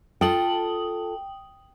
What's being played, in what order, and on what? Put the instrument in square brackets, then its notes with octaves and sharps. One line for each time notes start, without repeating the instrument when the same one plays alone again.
[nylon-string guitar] F4 A4 [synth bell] G5 D#6 F#7